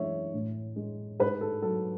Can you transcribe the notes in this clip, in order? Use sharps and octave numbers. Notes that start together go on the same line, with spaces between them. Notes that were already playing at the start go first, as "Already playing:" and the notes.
Already playing: F#2 E3 G#3 C#5 E5
A2
G#3
G#2 G#4 B4
A4
F#3 A4